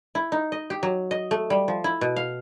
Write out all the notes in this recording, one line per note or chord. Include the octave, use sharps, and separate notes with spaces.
E4
D#4
D#5
G4
F#3
D#5
A3
G3
F3
E4
B2
F5